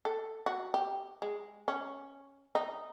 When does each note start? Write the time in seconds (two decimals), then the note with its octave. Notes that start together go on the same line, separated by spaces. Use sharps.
0.05 A4
0.46 F#4
0.74 G4
1.22 G#3
1.68 C#4
2.55 D#4